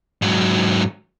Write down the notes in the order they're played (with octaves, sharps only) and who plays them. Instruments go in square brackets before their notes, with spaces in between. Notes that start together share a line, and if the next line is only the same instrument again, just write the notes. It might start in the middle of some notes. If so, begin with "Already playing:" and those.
[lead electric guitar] G#2 F#3